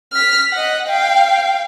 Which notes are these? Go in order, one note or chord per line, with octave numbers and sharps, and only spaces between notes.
F6 B6
D#5 F#5
F5 G5